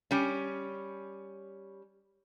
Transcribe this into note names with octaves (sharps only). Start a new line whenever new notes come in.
G3 C#4